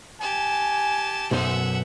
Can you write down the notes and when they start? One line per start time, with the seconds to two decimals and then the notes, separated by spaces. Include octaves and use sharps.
0.21 G4 G#5 A5
1.31 B1 F#2 C5 E5 F#5